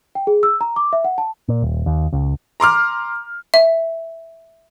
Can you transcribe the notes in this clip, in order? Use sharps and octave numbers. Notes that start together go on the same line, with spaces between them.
G5
G#4
E6
A#5
D6
E5
F#5
A5
A#2
D#1
D#2
C#2
A#5 C6 D6 F6
E5